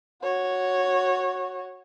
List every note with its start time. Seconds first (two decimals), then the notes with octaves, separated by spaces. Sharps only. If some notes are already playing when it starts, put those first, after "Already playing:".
0.23 F#4 C#5